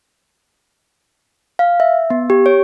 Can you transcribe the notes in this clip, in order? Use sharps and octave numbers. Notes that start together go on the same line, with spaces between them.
F5
E5
B3
G4
C#5